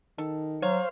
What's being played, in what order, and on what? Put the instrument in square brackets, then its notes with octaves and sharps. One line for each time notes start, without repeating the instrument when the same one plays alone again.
[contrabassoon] D#3 [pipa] A4
[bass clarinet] F#3 [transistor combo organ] C5 F5 [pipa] C#5